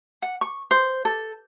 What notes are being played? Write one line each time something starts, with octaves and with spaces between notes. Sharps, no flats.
F#5
C#6
C5
A4